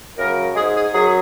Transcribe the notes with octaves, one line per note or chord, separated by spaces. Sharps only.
F#2 C#3 F#3 A#4
G#2 G#3 G#4
G#4
F#2 F#3 G#4